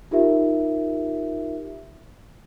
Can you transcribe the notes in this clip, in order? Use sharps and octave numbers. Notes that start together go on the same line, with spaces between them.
D#4 F4 G4 A#4 E5